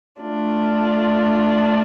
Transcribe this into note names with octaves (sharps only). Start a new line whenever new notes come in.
A3 D4 F4